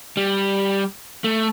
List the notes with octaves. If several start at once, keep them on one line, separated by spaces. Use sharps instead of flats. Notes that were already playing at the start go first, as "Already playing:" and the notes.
G3
A3